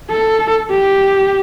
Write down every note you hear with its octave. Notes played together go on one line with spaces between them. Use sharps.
A4
G4